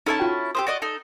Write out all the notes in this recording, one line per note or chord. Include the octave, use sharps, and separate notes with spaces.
C#4 D#4 E4 A4 A5
F4 F#4 G5
G4 B4 C5 D#6 E6
F#4 D5 D#5
D#4 A4